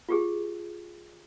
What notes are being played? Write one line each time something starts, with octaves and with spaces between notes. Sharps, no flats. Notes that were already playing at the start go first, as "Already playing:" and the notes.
F4 G4 G#4